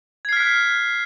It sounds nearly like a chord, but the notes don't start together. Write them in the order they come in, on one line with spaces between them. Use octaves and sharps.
G#6 C7 F6 B6 F#6